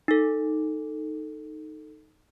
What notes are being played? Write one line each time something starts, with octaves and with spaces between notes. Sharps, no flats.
D#4 A4